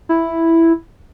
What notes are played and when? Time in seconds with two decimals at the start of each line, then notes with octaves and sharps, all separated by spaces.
0.09 E4